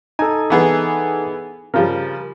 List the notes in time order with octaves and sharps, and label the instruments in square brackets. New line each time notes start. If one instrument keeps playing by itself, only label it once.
[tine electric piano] D#4 A4 [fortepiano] G#5
[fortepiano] E3 B3 G#4
[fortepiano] C#3 F3 G3 [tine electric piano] A#4